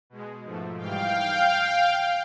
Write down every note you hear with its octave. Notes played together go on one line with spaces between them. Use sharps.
B2 G#3
G#2 F3 A3
G#2 E3 G3 F5 G5